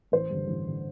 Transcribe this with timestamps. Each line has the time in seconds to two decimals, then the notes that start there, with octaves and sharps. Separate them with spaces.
0.12 A1 C5
0.30 G2 D3
0.48 A1
0.68 D3